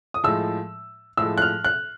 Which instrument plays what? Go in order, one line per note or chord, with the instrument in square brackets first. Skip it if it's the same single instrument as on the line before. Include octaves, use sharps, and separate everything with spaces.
[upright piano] D#6
[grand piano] A2 F3 G#3 [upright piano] E6
[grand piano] A2 F3 G#3 [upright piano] E6
[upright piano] F#6
F6
F#6